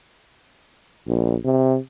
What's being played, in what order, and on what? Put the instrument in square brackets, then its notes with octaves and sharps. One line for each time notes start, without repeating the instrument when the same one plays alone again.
[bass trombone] A#1
C3